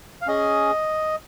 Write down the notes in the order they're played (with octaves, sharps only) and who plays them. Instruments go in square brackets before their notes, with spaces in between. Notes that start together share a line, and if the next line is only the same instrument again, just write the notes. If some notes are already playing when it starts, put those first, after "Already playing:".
[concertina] F5
C#4 G#4 D#5